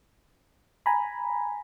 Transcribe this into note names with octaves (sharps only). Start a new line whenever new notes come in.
G#5 A#5 B5